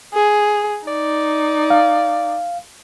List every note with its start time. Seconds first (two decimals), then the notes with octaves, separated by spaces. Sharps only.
0.14 G#4
0.88 D#4 D5
1.70 F5